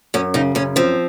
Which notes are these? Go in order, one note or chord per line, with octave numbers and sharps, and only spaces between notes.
F#2 C#4
C#3 D#4
F#2 C#4
F3 C4